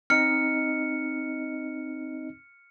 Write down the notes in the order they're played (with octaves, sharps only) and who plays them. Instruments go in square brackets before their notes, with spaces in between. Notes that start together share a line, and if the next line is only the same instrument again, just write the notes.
[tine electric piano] C4 D#4 D#5 [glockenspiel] F6 C#7